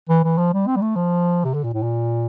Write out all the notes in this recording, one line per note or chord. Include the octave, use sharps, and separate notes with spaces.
E3
E3
F3
G3
C4
G3
A3
F3
C3
D3
A#2
A2
A#2